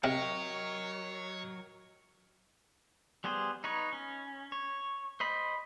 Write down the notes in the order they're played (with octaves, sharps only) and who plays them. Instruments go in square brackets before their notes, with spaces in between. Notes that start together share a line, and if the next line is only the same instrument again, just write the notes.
[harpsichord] C3 [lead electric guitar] F#3 [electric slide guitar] A#4 D#5 G5 [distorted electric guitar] C#5
[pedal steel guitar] G3 B3 G#4 C5
D#4 B4 C#5
C#4
C#5
C5 D#5 B5